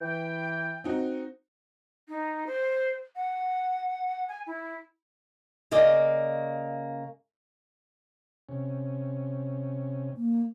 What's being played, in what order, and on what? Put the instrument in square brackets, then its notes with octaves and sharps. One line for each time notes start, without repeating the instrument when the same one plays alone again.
[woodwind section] E3 G5
[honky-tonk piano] C4 D#4 F#4
[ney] D#4
C5
F#5
G#5
E4
[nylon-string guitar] C#3 A#3 D5 D#5
[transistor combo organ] C3 C#4
[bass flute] A#3